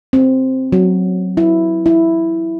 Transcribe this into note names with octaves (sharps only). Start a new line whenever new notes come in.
C4
F#3
E4
E4